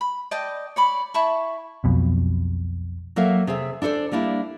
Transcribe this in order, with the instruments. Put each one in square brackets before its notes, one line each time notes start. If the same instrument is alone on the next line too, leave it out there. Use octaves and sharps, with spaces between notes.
[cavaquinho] B5
D5 D#5 G5 A5
C#5 D5 B5
E4 A5 B5 C#6
[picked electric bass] B1 F2 B2
[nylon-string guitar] F#3 A#3 A4 A#4 E5 F5
C3 G#4 A4 E5
D4 E4 A4 C5 D5
G3 A#3 D4 E4